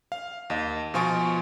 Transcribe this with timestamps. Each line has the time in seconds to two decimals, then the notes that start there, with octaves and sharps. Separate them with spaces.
0.12 F5
0.50 D#2 D#5
0.94 B2 F3 F4 G#5 C#6 D7